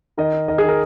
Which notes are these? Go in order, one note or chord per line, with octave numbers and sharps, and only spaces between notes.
D#3 A#4 D#5
D#4
D#3 A#4 D#5
G#4
D#3 A#4